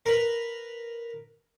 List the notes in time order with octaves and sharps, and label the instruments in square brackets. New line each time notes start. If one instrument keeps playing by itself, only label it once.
[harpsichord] A#4 B4